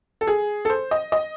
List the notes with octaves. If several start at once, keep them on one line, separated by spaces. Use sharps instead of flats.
A4
G#4
A4
C5
D#5
D#5